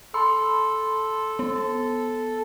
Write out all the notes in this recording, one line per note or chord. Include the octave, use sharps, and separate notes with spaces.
A4 B5 C6 E6
B3